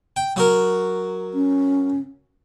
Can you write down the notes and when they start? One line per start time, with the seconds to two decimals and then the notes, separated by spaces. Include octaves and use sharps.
0.16 G5
0.36 F#3 F#4 A#4
1.34 C#4